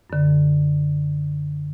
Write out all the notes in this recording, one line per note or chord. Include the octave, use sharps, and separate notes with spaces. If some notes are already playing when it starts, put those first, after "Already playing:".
F#2 D3